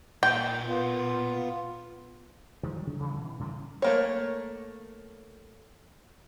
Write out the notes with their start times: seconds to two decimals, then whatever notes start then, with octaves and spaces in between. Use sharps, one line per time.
0.23 A#2 G5
0.67 B3 F4
2.63 D#3 F3 G#3
2.75 F#3 G3
2.87 C#3
3.00 C3 E3 G3 C#4
3.13 B2 E3
3.39 A2 C#3 G3
3.82 A3 A#3 C#5